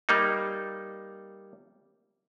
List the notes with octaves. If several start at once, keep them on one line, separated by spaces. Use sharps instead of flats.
G3 A#3 D#4